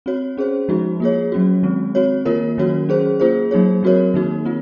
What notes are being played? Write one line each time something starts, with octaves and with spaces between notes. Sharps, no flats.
C4 F#4 C#5
C#4 G#4 C5
F3 G#3 D#4 F#4
A#3 F4 G#4 C#5
F#3 C#4 F#4
D#3 G#3 C4
C4 F#4 C#5
D#3 A#3 F4 A#4 C#5
D#3 F#3 C#4 F#4 C#5
C#4 G#4 C5
A#3 F4 G#4 C5
F#3 A#3 D#4 G#4 C#5
F#3 C4 F#4 A#4 C#5
D#3 A#3 D#4 F#4
C4 F4